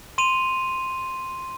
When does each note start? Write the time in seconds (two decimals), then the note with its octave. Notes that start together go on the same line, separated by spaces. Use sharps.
0.18 C6 D#7 F7